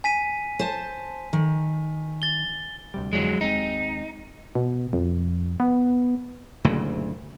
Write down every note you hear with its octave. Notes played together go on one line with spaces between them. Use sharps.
G#5 B6 D#7
C5 A5
D#3
A6 G7
D2 C3 G3
F2 D3 E3 F#3 G#3
D#2 G#3 C4 D#4
B2
F2
B3
F#1 D2 A#2 C#3